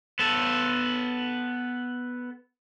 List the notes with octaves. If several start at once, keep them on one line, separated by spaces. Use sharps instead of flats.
B3 A4